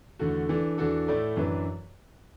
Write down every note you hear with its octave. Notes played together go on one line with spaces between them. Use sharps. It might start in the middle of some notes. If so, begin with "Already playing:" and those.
E2 D3 A3 F#4
E3 D4 A4
E2 E3 D4 F#4 A4
A2 A3 E4 D5
F#2 E3 D4 B4